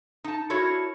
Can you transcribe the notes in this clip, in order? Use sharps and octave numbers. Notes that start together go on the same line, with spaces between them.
D#4 A5
D4 E4 F#4 A#4 C#5